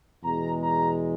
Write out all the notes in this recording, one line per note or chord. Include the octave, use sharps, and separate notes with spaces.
E2 B2 G#3 A#5
A#5